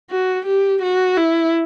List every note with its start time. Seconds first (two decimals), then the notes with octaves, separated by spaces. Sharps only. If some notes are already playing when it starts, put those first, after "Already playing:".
0.10 F#4
0.46 G4
0.82 F#4
1.17 E4